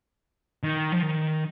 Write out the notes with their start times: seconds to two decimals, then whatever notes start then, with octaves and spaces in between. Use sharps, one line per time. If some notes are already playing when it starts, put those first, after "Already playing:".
0.63 D#3
0.92 F3
1.02 D#3